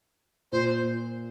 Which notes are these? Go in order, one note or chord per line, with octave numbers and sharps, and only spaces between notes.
A#2 C5